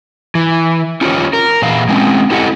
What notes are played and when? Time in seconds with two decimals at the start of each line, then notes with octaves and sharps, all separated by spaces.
0.35 E3
1.01 C#4 F4 G4 C#5
1.33 A#4
1.62 A#2 E3 F5
1.89 G#3 C4 C#4
2.30 C4 E4 G4 A4 D#5 F#5